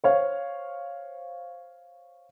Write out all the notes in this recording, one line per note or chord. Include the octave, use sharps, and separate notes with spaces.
C5 C#5 F5